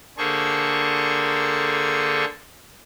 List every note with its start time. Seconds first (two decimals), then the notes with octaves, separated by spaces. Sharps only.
0.18 D3 A#3 G#4 A4 C5 C#6